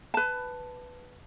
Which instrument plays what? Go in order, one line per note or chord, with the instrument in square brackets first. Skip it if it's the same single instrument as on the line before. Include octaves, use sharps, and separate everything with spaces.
[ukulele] B4 A5